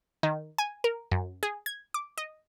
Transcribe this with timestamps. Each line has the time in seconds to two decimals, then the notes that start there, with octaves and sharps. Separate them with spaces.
0.23 D#3
0.58 G#5
0.84 A#4
1.11 F#2
1.43 G#4
1.66 G#6
1.94 D6
2.18 D#5